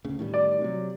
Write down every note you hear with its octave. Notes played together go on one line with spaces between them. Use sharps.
D2 C#3
A2 D#3 G3
D5
C3 F#3